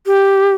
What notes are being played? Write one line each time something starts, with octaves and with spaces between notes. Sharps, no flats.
G4